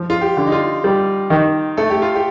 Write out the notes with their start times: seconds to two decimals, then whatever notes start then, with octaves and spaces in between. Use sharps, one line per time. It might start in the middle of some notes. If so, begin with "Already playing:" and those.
Already playing: F3
0.10 F4
0.21 G4
0.37 D3
0.47 D#4
0.52 F4
0.84 G3
1.30 D#3
1.77 A3 A4
1.90 G4
2.02 F4
2.15 G4